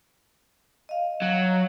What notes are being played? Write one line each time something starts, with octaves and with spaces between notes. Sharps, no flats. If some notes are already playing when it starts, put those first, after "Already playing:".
D#5 F5
F#3